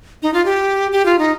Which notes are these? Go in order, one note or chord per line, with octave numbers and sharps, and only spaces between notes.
D#4
F4
G4
G4
F4
D#4